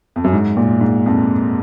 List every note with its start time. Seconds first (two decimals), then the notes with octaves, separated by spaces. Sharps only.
0.16 F2
0.24 F#2
0.33 G#2
0.57 A#2
0.81 G#2
1.06 F2